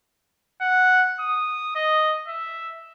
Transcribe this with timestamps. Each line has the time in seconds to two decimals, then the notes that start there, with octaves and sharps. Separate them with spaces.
0.61 F#5
1.20 D#6
1.76 D#5
2.28 E5